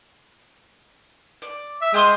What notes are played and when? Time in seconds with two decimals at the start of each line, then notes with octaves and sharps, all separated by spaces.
1.42 D5
1.82 E5
1.94 G#3 G4 C6 D#6